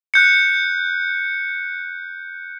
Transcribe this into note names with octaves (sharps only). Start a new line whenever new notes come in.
F#6 G6 C#7